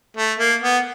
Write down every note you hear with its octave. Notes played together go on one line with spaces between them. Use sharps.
A3
A#3
B3